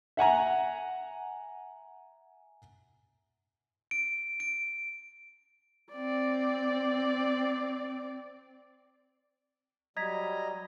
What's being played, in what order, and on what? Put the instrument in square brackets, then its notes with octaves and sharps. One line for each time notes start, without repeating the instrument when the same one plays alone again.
[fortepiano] E5 F#5 G#5 A#5
[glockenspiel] D7
D7
[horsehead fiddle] C4 D5
[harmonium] F#3 G3 [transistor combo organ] D#5 A#5 [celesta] G#6 B6